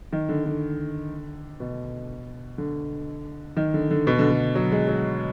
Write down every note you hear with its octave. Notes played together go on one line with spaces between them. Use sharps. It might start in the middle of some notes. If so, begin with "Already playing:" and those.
D#3
D3
D3
B2
D3
D#3
D3
D3
B2
D3
D3
F#3
G#3
F#3